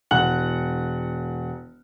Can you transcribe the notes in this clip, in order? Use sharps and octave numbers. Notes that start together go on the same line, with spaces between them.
E1 F#5 F#6 F#7